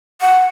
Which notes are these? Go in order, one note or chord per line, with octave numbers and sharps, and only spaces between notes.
F#5